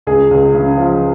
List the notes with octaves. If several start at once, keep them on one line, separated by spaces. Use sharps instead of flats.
C#2 G#4
C#2
C#3
F3